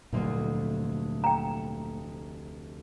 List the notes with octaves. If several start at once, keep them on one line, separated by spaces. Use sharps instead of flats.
F1 D2 A#2 F#3 A3 C6
G5 A#5